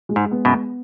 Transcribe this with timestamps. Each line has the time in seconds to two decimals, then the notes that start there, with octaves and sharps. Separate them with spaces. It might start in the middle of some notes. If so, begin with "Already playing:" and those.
0.09 G#3
0.16 G#2
0.31 B3
0.45 F#2 B2
0.53 B3